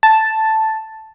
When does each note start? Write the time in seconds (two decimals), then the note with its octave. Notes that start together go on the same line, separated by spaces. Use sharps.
0.03 A5